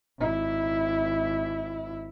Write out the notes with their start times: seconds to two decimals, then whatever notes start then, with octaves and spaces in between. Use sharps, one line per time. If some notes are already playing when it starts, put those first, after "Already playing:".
0.20 G#1 E4